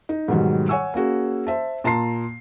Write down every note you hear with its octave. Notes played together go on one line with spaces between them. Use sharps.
D#4
G#2 B2 D#3 F#3 G3
C#5 F#5 G#5 C#6 E6
A#3 C#4 F#4 G#4
C5 E5 A5
A#2 A5 A#5 C6 C7